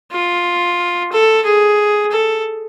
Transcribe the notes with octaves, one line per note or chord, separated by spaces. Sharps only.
F4
A4
G#4
A4